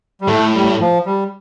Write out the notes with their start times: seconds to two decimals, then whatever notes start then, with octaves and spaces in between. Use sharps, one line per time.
0.21 G3
0.27 A2 A3
0.54 G3
0.80 F3
1.06 G3